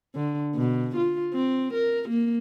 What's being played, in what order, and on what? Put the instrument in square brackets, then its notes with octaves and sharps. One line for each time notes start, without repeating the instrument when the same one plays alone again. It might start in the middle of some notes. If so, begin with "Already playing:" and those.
[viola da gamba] D3
B2
F4
C4
A#4
A#3